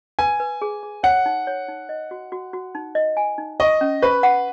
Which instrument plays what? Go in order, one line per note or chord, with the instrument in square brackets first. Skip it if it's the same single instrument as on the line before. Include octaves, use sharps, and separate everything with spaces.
[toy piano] B4 [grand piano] G#5
[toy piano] B4
G#4
G#4
[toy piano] C#5 [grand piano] F#5
[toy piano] D#4
C#5
D#4
D#5
F#4
F#4
F#4
D#4
D#5
G#5
D#4
[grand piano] D#5 [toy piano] C#6
[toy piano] C#4
[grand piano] B4 [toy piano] C#6
[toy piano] F#5